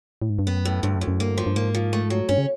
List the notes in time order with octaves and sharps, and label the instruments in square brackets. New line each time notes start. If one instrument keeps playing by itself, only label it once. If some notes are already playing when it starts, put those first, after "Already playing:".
[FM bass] A2
G#2
G2
[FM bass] F#2 [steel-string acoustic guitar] B3
[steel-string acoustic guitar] A2
[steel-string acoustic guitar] D2 [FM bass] G2
[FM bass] F#2
[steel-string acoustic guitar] D2
[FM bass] F#2
[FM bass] G2 [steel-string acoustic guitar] A#3
[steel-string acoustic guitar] F3
[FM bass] G2
[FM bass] G#2 [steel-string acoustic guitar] A#3
[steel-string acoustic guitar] F3
A3
F#3
[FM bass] G2 [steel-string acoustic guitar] C#4
[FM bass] C#3